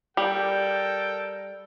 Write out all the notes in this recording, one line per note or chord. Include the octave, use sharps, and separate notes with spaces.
G3 A4 A#4 G5